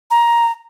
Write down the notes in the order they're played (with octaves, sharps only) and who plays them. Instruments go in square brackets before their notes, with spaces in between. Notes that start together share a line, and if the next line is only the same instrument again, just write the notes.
[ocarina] A#5